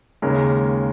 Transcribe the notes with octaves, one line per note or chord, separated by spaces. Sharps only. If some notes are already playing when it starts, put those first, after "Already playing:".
D#2 C#3 G#3 A#4